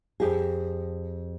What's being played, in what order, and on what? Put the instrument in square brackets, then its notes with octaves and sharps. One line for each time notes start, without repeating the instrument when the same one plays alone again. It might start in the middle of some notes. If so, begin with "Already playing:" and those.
[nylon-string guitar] F2 G4 G#4